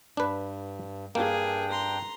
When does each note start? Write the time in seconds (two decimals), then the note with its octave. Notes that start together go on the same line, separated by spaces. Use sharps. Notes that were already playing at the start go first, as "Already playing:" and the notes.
0.17 G2 D4 B4
1.15 G2 A#3 D4 G#4 A#4 G5
1.70 A#5 C6